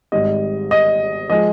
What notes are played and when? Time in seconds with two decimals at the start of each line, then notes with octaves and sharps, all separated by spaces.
0.12 G#1 G#2 G3 D#5
0.71 D#5
1.30 F3 G#3 D#5